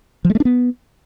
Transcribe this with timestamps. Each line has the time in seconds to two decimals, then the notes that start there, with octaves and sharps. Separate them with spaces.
0.25 F3
0.30 G#3
0.35 A3
0.40 D4
0.45 B3